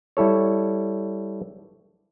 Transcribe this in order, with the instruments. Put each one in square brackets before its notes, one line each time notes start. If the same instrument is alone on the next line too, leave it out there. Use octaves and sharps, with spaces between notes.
[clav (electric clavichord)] G3 E4 A4 C#5